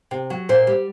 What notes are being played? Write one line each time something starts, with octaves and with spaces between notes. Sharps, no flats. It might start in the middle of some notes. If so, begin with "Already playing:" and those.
C3
F#3
A#2 C5
G3